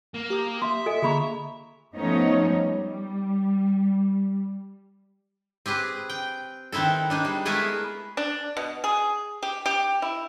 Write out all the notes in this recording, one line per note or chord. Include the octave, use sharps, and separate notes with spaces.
A#3
G4 D#6
E5 C6
A4 D#5 G#5
D3 A#3 G#4 A#5 B5 C#6
F3 A3 B3 C#4 D#4 C#5
G3
C4 G4 G#4 B4
G5
D#3 B3 C4 E4 A4
D4 D#4 G#4
G3
G#3 A3 B3 E4 G#4 A#4
D4
B2
G#4
G4
G4
E4